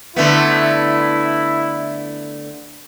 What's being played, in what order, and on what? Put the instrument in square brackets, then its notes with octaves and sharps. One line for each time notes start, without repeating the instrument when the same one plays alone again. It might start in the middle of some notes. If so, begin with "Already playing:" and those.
[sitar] D3 A3 B3 [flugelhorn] E4